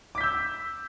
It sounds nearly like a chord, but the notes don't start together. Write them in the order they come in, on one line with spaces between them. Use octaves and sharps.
D6 B6 G6 E6